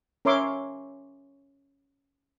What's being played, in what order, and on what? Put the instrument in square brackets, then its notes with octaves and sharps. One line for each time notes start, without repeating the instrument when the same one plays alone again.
[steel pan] C#4 A#4 C#5 E5 C6 D6